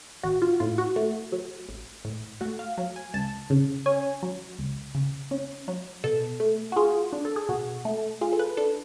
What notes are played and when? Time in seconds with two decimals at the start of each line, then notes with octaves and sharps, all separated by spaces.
0.23 A1 F#4
0.42 F4
0.60 A2 F4
0.78 F#4
0.96 A3
1.32 F#3
1.69 A1
2.05 A2
2.41 A3 F#4
2.59 F5
2.78 F#3
2.96 G#5
3.14 C#2 A5
3.50 C#3
3.86 C#4 G#5
4.23 F#3
4.59 C#2
4.95 C#3
5.31 C#4
5.68 F#3
6.04 B2 A4
6.40 A3
6.72 F#4
6.76 F4 G#4
7.12 D4
7.25 A4
7.36 G#4
7.49 B2 F#4
7.85 A3
8.21 F4 G#4
8.33 A4
8.39 B4
8.57 D4 A4